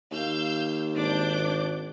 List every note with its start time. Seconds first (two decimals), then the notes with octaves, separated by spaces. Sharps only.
0.12 D#2 F5 E6 G6
0.96 G#1 D4 D6 G6